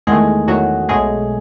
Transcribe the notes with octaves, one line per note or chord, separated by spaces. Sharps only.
E2 D#3 G#3 A3 G#4
E2 D#3 F#3 A3 F#4
B1 B2 F#3 G#3 A3 G#4